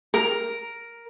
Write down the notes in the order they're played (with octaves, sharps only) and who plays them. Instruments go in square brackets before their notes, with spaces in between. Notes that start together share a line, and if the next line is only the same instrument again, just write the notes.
[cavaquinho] A#4